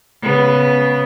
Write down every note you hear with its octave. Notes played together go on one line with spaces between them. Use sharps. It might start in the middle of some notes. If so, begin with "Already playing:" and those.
C#3 B3